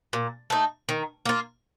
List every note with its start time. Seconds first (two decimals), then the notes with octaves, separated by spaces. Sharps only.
0.13 A#2
0.50 A3 D#4
0.89 D#3
1.25 A#3 F4